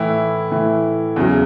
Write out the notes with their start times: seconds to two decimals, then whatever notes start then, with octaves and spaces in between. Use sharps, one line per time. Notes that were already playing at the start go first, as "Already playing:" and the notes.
Already playing: A2 E3 E4
0.51 A2 E3
1.16 E2 C#3 F#3